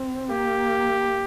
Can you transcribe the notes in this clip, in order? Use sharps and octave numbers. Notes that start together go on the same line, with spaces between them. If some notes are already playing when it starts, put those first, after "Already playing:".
Already playing: C4
A#3 G4